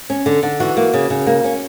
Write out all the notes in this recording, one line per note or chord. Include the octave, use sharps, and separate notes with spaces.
C#4
D3
D3
E3 F#4
A#3
C#3
C#3
A#3
C#4